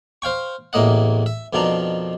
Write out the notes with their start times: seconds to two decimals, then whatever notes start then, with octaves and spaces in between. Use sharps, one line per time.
0.22 C5 F5 G5 C#6
0.73 A1 E2 A2 A#3 D#5 F#5
1.26 E5
1.53 F2 B2 D#3 F3 D4 A#5